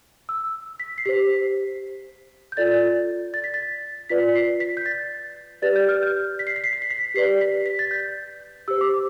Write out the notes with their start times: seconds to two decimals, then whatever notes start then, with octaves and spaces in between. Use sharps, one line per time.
0.29 E6
0.80 B6
0.98 C7
1.05 G4 C5 B6
2.52 G6
2.57 F4 A4 D5 A6
3.34 A6
3.44 B6
3.54 A6
4.09 F4 B4 D5 B6
4.35 C7
4.60 B6
4.77 G6
4.86 A6
5.62 G4 B4 D5 A6
5.76 G6
5.88 F6
6.03 G6
6.39 B6
6.47 C7
6.56 B6
6.64 C7
6.73 B6
6.82 C7
6.91 B6
7.14 G4 B4 D5 C7
7.41 B6
7.66 B6
7.79 A6
7.91 G6
8.68 G4 C5 E6
8.81 D6